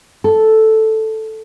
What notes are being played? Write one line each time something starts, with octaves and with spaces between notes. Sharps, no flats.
A4